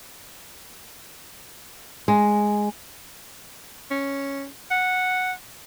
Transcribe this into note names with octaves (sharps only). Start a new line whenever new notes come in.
G#3
C#4
F#5